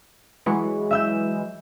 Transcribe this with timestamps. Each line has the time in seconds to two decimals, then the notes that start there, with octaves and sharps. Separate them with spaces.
0.46 E3 F#3 G#3 C#6
0.91 E5 E6 G6